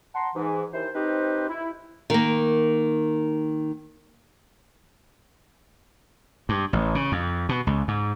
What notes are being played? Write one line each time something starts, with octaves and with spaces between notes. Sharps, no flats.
F#5 A5 A#5 C6
G#2 E3
D#2 E4 C5
C4 D#4 G4 B4 C5
E4
D#3 A#3
G2
A1
C#3
F2
B2
C#2
G#2